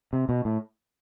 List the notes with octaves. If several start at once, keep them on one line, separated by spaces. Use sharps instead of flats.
C3
B2
A2